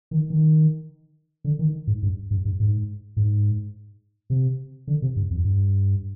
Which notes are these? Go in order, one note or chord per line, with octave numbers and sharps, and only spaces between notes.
D#3
D#3
D3
D#3
G#2
G2
G2
G2
G#2
G#2
C3
D3
C3
G2
F2
G2